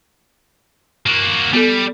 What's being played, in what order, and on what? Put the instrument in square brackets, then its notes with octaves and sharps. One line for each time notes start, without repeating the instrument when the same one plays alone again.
[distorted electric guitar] A#3 F#4
[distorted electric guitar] G3 [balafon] B3 A4